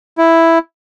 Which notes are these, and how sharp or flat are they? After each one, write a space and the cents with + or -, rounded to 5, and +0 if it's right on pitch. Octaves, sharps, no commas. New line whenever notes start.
E4 +0